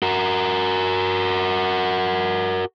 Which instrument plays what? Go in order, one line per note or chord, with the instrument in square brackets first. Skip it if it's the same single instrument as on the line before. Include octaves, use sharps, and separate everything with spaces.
[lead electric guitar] F#4 A#4